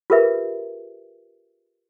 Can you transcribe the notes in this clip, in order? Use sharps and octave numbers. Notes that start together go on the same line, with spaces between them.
F4 G4 G#4 A#4 B4 E5